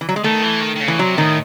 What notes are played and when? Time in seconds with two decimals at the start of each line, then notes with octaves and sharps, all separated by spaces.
0.01 E3
0.09 F#3
0.16 G#3
0.24 D#3 A3
0.42 E3
0.61 D#3
0.76 D#3
0.81 C#3
0.88 E3
0.99 C3 F#3
1.18 A2 D#3